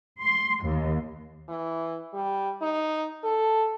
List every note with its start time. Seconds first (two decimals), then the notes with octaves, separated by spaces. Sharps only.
0.21 C6
0.64 D#2
1.48 E3
2.14 G3
2.61 D#4
3.23 A4